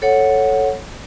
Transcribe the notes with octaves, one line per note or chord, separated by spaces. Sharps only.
A4 C#5 F#5